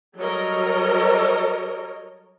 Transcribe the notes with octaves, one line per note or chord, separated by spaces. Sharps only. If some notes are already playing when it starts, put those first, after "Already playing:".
F#3 G3 A4 A#4 C#5 D#5